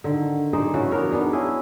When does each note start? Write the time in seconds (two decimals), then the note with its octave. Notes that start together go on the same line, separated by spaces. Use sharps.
0.04 D3 D#3
0.53 D#4 G#4 C5 D5
0.74 C#3 E3 A3 F#4
0.91 B3 D4 A#4 C#5
1.11 B3 D4 D#4 G#4
1.33 C#4 E4 G#4